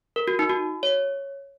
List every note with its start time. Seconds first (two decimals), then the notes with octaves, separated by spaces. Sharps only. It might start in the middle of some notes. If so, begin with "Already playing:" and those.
0.16 A#4
0.28 F#4
0.39 D#4
0.49 F#4
0.83 C#5